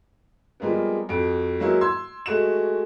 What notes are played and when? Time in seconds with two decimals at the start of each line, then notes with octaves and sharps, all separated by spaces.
0.60 F3 G3 G#3 A#3 B3
1.09 F2 F#4 D7
1.60 F#3 G#3 A#3 E4 F#4
1.81 C6 E6 G#6
2.26 G#3 A3 F#4 E7